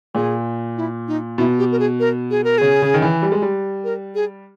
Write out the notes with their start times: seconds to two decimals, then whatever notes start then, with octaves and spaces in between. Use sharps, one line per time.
0.15 A#2 G#4
0.77 E4
1.07 D#4
1.38 B2 E4
1.58 G4
1.71 A#4
1.79 G#4
2.00 A#4
2.30 G#4
2.44 A#4
2.58 C#3 G#4
2.82 C#3
2.94 D#3
3.02 E3
3.22 G3
3.32 G#3
3.42 G3
3.84 A#4
4.15 G#4